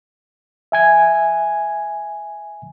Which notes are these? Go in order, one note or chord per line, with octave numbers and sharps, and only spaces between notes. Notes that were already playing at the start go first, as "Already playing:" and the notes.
E5 G#5 G#6